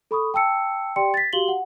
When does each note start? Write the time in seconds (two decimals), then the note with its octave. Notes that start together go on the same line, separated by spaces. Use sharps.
0.11 A4 B5 C#6 D#6
0.34 G5 A5 E6 C#7
0.96 G4 D5 G5 C6 C#7
1.14 A6 B6
1.33 F#4 G4 F5 C6 F#7 G7
1.48 F#5